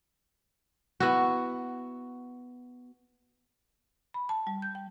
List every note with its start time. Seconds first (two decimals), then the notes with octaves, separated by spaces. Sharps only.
1.00 B3 E4 F#4
4.14 B5
4.29 A5
4.47 G3
4.62 G6
4.75 G5